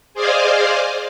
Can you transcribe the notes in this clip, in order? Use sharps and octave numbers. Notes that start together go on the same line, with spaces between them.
G#4 C5 D5 D#5 F5 G#5